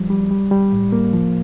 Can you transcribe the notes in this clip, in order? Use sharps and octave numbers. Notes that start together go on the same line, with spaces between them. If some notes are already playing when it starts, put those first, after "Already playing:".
Already playing: F3 G3
G3
G3
G3
A2
A#3
F3